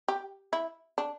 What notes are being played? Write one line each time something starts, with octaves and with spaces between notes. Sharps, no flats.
G4
E4
D4